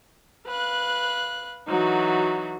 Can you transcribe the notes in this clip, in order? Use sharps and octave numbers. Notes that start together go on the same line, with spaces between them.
B4 F5 F#6
E3 F#3 D#4 F#4